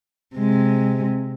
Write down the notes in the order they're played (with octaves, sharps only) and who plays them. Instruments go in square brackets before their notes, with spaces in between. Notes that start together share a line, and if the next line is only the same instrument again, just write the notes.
[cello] C3 G#3